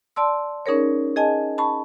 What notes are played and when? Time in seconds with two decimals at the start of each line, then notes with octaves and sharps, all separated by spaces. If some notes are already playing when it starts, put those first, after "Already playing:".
0.16 D5 A5 C6 E6
0.66 C#4 D#4 G#4 A#4 C#5
1.16 G#4 D#5 G#5 A5
1.58 A5 B5 C#6